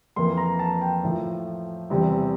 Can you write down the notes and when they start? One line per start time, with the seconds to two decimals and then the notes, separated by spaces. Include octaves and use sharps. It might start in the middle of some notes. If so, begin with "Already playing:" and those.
0.16 F2 E3 A#3 C6
0.37 A#5
0.59 A5
0.81 G5
1.03 A2 F3 A3
1.90 E2 C3 G3